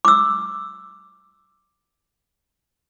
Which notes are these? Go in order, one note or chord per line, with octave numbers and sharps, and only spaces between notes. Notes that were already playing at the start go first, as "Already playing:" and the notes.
D6 E6